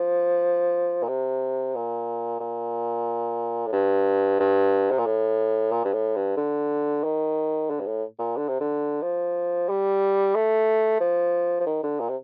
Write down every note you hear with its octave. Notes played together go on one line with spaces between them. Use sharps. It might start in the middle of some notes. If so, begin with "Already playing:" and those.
Already playing: F3
A#2
C3
A#2
A#2
A2
G2
G2
C3
A#2
A2
A#2
G2
A2
G2
D3
D#3
D3
G2
A2
A#2
D3
C3
D3
F3
G3
A3
F3
F3
D#3
D3
A#2
C3